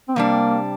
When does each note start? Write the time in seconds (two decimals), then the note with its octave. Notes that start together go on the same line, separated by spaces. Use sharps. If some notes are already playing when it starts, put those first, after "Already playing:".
0.08 C4
0.16 C3 G3 A#3 D4